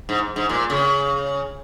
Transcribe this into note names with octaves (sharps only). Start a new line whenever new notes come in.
G#2
G#2
A#2
C#3